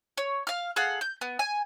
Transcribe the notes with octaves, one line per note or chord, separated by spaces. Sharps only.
C#5
F5 F6
G#4 A4 F5 F#5
G6
B3
G#5